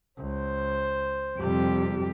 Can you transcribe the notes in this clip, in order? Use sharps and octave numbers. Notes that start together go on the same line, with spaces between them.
C#2 C5
F2 C3 G3 G4